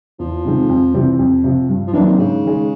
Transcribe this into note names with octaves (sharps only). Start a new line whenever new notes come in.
E2 F3
C3 D#3 G#3 C4
F2
C3 E3 G3 C4
F2
C3 F3
G2
F3
D#3 E3 F#3 A#3 D4
C3
G#2 C#3
D#3 G#3